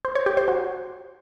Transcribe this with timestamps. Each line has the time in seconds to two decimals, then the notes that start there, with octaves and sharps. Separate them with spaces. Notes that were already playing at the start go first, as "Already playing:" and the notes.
0.05 C5
0.15 C#5
0.26 G4
0.37 C5
0.48 F#4